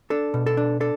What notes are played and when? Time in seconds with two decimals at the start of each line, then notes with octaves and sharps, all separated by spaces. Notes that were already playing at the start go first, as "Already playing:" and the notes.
0.10 D4 A4
0.34 B2
0.46 A4
0.57 D4
0.80 D4 A4